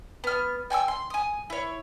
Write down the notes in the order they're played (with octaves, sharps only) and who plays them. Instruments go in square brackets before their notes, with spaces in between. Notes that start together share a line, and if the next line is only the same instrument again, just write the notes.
[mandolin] B3 F6
G5 G#5 C#6 E6
C6
G#5 D#6
E4 C#5